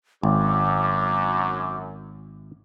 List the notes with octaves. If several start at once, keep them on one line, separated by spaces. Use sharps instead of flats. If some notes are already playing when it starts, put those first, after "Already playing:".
G#1 F#2 D6